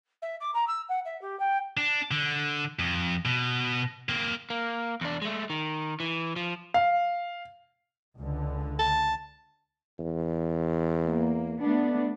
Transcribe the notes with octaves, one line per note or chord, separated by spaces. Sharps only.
E5
D6
A#5
E6
F#5
E5
G4
G5
D4
D3
F2
B2
A#3 C4
A#3
E2 D4
G#3 A3
D#3
E3
F3
F5
C#2 D3
A5
E2
A#3
A3 B3 D4